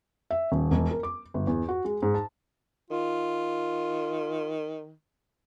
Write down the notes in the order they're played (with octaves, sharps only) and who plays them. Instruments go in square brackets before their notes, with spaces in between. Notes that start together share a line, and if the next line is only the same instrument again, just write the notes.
[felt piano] E5
D#1
E1
A#4
D6
G1
E2
F#4
G#3
G#2
A5
[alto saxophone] D#3 [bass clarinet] F4